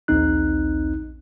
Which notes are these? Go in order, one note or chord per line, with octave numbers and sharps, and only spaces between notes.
A#1 D#2 C4 D#4 F#6